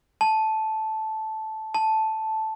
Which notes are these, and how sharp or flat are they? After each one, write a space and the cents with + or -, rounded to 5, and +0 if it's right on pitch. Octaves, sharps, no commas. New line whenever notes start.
A5 -10
A5 -5